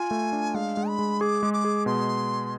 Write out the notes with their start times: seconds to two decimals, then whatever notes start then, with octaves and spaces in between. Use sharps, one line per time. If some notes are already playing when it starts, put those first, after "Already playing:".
Already playing: F4 G#5
0.11 A3
0.32 D4
0.54 G#3 F5
0.77 G#3
0.88 B5
0.99 G#3
1.21 G#4 D6
1.43 G#3
1.53 D6
1.65 G#4
1.86 B2 C6